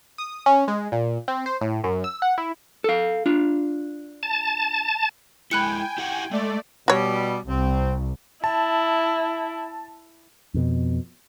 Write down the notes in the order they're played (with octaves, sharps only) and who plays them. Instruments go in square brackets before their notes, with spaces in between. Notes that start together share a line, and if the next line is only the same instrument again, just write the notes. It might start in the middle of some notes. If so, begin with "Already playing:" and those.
[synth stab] D#6
C#4
G#3
A#2
C4
C5
A2
F#2
E6
F#5
E4
[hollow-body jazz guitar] A4 F5
D4 F4
[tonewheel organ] A5
[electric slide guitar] G#3 E4 [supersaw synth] G5 G#5 [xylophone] B5 F#6 C#7
[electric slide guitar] E4 G4 F#5
[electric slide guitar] G#3 [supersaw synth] A3 D5
[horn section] B2 G3 [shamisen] F#4 C#5
[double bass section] C2 [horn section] C4
[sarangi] E4 [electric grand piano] A5
[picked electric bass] F2 B2